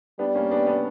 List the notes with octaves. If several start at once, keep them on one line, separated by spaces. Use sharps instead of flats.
G3 B3 D4
A#3 C#4
B3 D4
B3 D4